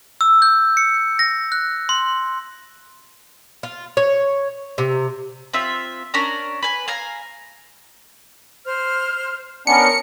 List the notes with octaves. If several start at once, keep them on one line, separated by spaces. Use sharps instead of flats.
E6
G6
C#7
A#6
F#6
C6
F4
C#5
C3
C4 F4 E5
C#4 D4 A#4 A#5
B4 G#5
F5 G#5 A#5
C5 F6
B3 C#4 D4 A#4 C#7